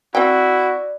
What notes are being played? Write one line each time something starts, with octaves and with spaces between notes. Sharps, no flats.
C4 E4 F#4 D5 G5